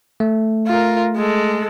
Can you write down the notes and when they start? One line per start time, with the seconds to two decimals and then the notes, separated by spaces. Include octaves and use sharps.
0.20 A3
0.67 F4 A#4
1.16 G#3 A4